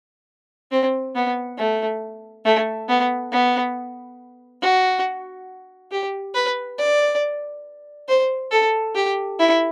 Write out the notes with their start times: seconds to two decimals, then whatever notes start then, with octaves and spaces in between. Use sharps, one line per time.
0.71 C4
1.16 B3
1.58 A3
2.45 A3
2.89 B3
3.32 B3
4.62 F#4
5.92 G4
6.34 B4
6.78 D5
8.08 C5
8.51 A4
8.95 G4
9.39 E4